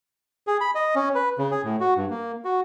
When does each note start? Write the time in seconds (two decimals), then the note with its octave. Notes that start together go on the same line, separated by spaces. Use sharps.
0.47 G#4
0.61 B5
0.75 D#5
0.95 C#4
1.15 B4
1.38 C#3
1.51 G#4
1.64 A2
1.80 F#4
1.96 G2
2.10 A#3
2.45 F#4